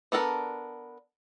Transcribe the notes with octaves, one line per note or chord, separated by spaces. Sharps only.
B3 D4 A4 A#4